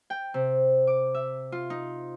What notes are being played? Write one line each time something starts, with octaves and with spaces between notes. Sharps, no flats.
G5
C3
D6
E5
F4
D#4